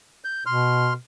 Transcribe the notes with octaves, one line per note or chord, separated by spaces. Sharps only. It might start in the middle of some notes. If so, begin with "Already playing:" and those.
G6
B2 C6 F6